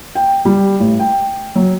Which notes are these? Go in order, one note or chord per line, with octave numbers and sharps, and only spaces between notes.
G5
G3
A1
G5
F#3